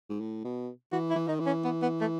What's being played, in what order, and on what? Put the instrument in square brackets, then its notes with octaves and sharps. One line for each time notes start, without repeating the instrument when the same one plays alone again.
[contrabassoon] G#2
A2
B2
[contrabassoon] E3 [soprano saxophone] F#4
[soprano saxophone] E4
[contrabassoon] E3
[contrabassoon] D#3 [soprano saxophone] D#4
[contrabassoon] E3
[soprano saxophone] C#4
B3
B3
A3